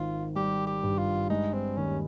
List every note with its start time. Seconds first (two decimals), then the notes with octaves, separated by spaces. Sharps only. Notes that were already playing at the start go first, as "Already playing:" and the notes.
Already playing: G#1 D#3 F4
0.35 G3 G4
0.67 G4
0.83 G2
0.98 F4
1.30 G#3 D#4
1.54 C4
1.77 D#2 C#4